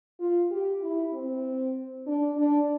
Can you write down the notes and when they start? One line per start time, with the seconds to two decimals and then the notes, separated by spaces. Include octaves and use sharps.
0.20 F4
0.51 G4
0.81 E4
1.13 C4
2.07 D4
2.37 D4